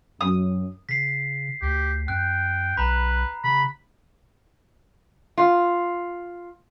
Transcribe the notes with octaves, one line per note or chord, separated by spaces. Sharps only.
F#2 D#6
C#3 B6 C7
D2 G4
F#2 G5 F#6
B1 B4 A#5 B5
C#3 B5
F4